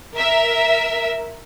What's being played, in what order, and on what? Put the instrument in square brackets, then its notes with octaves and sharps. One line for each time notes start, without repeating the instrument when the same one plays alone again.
[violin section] A#4 E5